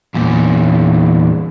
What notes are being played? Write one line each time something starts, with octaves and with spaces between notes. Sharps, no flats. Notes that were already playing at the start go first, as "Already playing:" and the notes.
E2 A#2